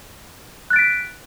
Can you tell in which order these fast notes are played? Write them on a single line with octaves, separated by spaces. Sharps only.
F#6 A6 D7 B6